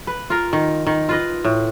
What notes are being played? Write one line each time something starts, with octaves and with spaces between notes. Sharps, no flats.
B4
F4 A#4
D#3
D#3
F4 B4 D#5
A2